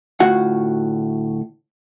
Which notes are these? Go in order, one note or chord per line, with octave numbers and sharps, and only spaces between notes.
D2 A2 F4 F#4 F#5